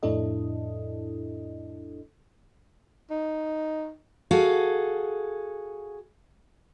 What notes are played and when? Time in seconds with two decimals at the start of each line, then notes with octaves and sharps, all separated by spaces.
0.03 F2 A2 D4 E4 A4 D#5
3.10 D#4
4.31 F#4 G#4 A4 F5